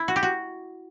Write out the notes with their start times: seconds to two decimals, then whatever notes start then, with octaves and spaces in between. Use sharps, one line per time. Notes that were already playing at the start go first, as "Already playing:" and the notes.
Already playing: E4
0.08 F#4
0.16 G4
0.23 F#4